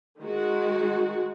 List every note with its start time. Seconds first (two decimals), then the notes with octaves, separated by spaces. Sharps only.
0.20 D#3 G#3 F#4